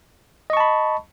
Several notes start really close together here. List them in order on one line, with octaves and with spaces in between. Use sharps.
D#5 C#6 A5 B5